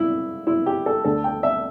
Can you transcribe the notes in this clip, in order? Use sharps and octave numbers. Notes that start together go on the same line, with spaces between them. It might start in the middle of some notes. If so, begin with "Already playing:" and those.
Already playing: E4
E4
G4
A4
D2 D3 A4
G5
E5